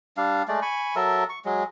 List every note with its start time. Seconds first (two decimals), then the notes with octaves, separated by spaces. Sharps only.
0.17 G3 D4 F5
0.48 G#3 A3 D5
0.62 G#5 B5 C#6
0.96 F#3 A4 A#4 E5
1.29 C#6
1.45 F#3 G#3